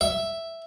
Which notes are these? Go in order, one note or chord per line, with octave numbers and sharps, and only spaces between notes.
E5